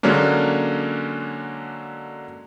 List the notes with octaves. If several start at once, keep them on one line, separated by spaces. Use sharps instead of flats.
D3 F#3 G#3 A#3 C#4 D4